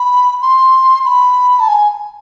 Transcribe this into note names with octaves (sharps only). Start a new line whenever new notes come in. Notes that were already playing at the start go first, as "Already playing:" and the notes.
Already playing: B5
C6
B5
A5
G#5